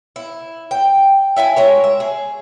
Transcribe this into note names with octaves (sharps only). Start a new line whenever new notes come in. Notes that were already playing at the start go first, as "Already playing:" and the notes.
E4
G5
E4 E5 G5 G#5
G#3 A#4 C#5
E5
G#4